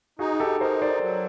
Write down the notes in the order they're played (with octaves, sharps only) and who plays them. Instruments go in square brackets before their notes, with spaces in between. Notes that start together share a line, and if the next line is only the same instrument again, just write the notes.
[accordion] D#4 [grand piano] F#4 G#4
[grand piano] G4 A4
[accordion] D#4 [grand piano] A#4 C5
[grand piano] C5 D5
[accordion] F#3